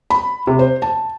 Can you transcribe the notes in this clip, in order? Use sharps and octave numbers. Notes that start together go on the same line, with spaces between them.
B5
C3
C5
A5